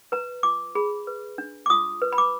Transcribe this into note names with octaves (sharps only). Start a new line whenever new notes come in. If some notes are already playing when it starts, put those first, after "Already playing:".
B4 A#5
F4 D6
G#4 B5
B4
D4
D6
F4 D#6
B4
B5
D6